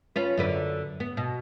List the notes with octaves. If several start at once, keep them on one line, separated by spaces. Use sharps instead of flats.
C#4 F4 B4
F#2 D3 B4
B3
B2